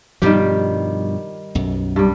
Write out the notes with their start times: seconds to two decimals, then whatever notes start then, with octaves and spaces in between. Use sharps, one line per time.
0.22 G2 B2 D#3 F3 G3 G4
1.55 B1 F#2
1.96 G2 G3